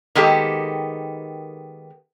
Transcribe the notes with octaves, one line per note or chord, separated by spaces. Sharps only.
D#3 G#3 A#3 B3 G4 A4